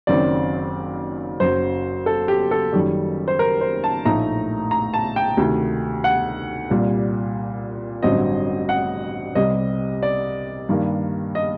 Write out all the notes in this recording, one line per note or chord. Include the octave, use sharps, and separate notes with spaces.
F#1 F#2 D#3 F#3 C4 D5
F#1 F#2 F#3 C5
A4
G4
A4
F#1 F#2 D#3 G3
C5
A#4
C5
A5
A#1 A2 A3 D#4 A#5
A#5
A5
G5
D2 C3 D#3 A3
F#5
C2 A#2 G3
A1 G2 D3 F#3 C4 D#5
F#5
C2 C3 G3 C4 D#5
D5
G2 D#3 G3 A#3
D#5